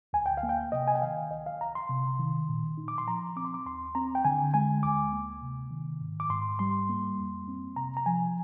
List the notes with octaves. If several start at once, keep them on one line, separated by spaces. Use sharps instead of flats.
D2 G#5
G5
F5
A#3
G5
C3 D#5
G#5
G5
D#3 F5
C2 D#5
F5
C2 A#5
C6
C3
D#3
A#2
D#4
D6
C6
F3 A#5
C4 D6
C6
D6
D#2 C6
C4 A#5
G5
D3 G#5
G#3 G#5
D2 D6
A#3
C3
D#3
G#2
D6
G#2 C6
G3 C6
A#3
F2
C4
C3 A#5
A#5
F3 G#5